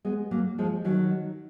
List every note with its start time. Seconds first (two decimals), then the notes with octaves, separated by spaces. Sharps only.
0.05 G#3 B3
0.31 F#3 A#3
0.58 F3 G#3
0.85 D#3 F#3